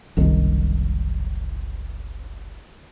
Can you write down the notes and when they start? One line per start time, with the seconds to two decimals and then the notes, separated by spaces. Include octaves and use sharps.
0.17 F#1 C2 D#3